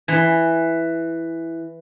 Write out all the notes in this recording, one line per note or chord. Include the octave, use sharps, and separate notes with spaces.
E3